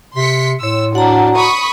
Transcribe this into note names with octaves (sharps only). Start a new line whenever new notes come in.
C3 C6 B6 C#7
A2 C#5 C6 E6
D4 F#4 F#5 A#5
B5 C#6 D#6